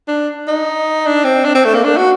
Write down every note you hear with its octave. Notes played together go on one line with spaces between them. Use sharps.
D4
D#4
D4
C4
D4
C4
A3
A#3
D4
F#4